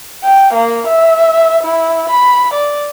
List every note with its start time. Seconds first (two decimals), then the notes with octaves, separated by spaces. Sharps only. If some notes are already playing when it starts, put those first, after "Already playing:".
0.24 G5
0.54 A#3
0.87 E5
1.64 E4
2.10 B5
2.54 D5